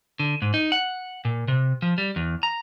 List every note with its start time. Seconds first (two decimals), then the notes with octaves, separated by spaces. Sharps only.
0.19 D3
0.42 G#2
0.54 D#4
0.72 F#5
1.25 A#2
1.48 C3
1.82 F3
1.98 G3
2.16 E2
2.43 A#5